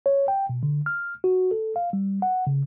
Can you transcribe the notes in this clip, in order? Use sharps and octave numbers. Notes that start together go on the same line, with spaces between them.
C#5
G5
B2
D3
F6
F#4
A4
F5
G3
F#5
C#3